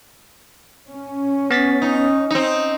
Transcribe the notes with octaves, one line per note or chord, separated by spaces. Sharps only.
C#4
B3 A6 B6
D#4
C4 D#4 D#5